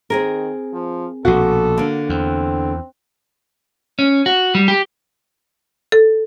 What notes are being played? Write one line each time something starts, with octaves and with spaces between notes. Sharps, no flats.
D#3 C4 G#4 A#4
F3
A#1 B2 F#4 A4
D3 A#3
E2 C4
C#4
F#4
G3
G4
A4